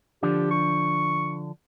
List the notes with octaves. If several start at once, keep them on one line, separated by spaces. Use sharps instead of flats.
D3 F3 D4 G4
C#6